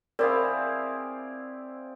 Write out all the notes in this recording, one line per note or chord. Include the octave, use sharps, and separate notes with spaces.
C4 E4 G#4 A#4 D5 F5